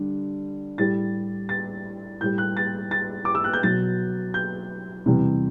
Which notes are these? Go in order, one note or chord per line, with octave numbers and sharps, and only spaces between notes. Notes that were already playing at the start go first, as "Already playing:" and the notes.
Already playing: D3 G3
A2 G3 A6
A6
A2 G3 G6
F#6
A6
A6
D6
E6
F#6
G6
B2 F#3 A6
G6
E2 C3 G3